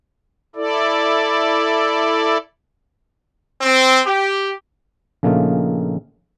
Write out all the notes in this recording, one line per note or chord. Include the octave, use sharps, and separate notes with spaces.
E4 A4 D5
C4
G4
A#1 C#3 A3 A#3 D#4 F4